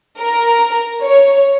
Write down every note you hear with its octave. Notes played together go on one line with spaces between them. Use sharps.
A#4
C#5